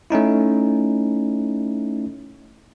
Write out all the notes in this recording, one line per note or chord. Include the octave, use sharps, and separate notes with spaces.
A3 C#4 D#4 E4